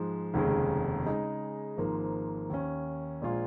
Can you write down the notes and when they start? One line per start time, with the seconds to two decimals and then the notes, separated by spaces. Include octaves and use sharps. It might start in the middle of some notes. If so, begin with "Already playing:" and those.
Already playing: G#2 F3 G#3
0.34 F1 D#2 C#3 G#3
1.05 C#3 G#3 D#4
1.77 G#1 G#2 F3 A#3
2.50 D#2 D#3 C#4
3.21 A#1 A#2 G#3 F4 G#4